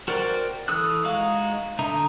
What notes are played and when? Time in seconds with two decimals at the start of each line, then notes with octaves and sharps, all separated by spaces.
0.08 F#4 A#4 C5 D5 G5
0.68 E3 A4 D#6 E6 F#6
1.04 G#3 D#4 F#4 F5
1.79 D3 D#4 E5 A#5